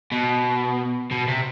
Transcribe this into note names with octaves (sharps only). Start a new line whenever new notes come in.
B2
B2
C3